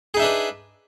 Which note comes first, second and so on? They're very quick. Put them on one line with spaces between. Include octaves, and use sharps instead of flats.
G#4 D#4 E5 D4 B4